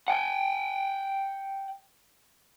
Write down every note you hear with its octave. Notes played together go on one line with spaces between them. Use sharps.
F#5 G5